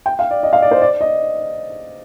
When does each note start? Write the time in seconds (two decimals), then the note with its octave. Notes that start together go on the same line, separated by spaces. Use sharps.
0.06 G5
0.19 F5
0.31 D5
0.43 D#5
0.53 F5
0.62 D5
0.71 C5
0.81 D5
1.01 D#5